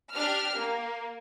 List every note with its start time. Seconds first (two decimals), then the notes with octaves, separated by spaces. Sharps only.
0.14 D4 G4 F6
0.55 A#3